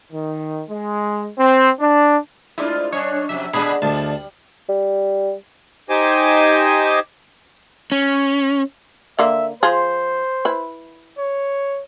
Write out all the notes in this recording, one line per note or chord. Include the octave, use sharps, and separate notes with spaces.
D#3
G#3
C4
D4
G#3 A3 D4 E4 F4 C5 D5
F#2 D4 D#4 C#5
F2 C3 F#3 E5
A#2 D3 G#3 B3 D4 G#4 B5
D2 G3 A5
G3
D#4 G4 C5 D#5 G#5 D6
C#4
D3 A#3 E5
F3 F4 G#4 C5
E4 B4
C#5